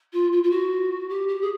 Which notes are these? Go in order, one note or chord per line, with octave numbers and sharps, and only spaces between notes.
F4
F4
F4
F#4
G4
G4
G#4